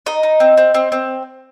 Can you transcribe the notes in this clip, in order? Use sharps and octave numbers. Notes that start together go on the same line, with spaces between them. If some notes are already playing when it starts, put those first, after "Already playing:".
D#4 D#5
D#4
C4
C4
C4
C4